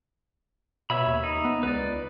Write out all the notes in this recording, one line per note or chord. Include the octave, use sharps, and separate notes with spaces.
B2 C#5 E5 B5
D#2
D#4
B3
C#2 B4 D5